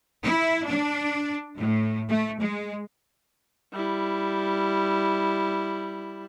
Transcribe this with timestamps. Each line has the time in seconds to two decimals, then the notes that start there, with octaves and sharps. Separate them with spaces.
0.23 E4
0.66 D4
1.57 A2
2.09 A3
2.40 G#3
3.73 G3 E4